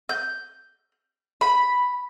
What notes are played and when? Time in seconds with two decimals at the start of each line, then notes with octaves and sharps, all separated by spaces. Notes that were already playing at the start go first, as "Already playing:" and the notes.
0.09 G6
1.41 B5